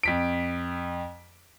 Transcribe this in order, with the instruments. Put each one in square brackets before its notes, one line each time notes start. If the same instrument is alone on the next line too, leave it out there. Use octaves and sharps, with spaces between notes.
[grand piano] F2 B6 D7